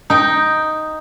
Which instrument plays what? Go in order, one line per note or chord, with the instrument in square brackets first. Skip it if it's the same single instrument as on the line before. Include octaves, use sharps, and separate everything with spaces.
[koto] D#4 G5